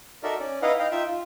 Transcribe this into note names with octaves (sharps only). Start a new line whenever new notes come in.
D#4 F#4 A4 A#4 D5 E5
C#4 D5
D#4 E4 B4 D#5 F5 F#5
D#5 F5 G5
D#4 F4 E5 G5
F4